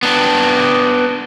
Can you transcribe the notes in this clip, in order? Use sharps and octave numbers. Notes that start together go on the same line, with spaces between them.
B3 D4